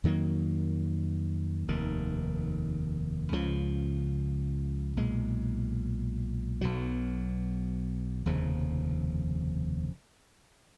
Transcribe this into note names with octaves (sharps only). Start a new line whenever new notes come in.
F2 D#3 F#3 A#3
F1 D#2 D#3
C#2 C#3 F3
B1 A#2 G#3
B1 B2 F#3
F1 D#2 C#3 F3